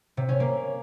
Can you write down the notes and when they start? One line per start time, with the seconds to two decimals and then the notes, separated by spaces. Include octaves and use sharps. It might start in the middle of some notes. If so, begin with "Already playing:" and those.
0.17 C3
0.29 C#4
0.40 A#3